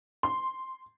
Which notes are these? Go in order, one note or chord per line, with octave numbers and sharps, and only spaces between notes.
C6